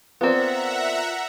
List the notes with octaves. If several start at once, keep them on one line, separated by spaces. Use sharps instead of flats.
B3 C4 F4 A#4 D5 E5 F#5 A#5